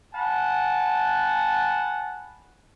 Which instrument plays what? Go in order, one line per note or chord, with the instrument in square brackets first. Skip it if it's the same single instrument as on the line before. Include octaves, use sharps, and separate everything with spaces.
[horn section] F#5 G#5 A5 B5